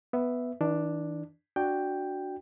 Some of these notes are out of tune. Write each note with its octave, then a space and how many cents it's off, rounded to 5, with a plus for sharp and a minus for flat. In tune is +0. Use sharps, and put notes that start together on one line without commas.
B3 +0 E5 +5
E3 -40 D4 +5
D4 +5 F#4 +0 G5 +5